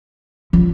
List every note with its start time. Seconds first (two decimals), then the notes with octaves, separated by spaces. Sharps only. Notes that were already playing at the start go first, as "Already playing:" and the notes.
0.53 F3